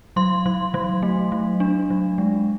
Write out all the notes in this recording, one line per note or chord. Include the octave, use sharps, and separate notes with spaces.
F#3 C6
F#3
F#3
A3
F#3
D4
F#3
G#3